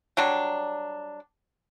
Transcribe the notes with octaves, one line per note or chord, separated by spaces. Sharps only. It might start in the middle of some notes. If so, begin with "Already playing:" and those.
F#3 G3 D4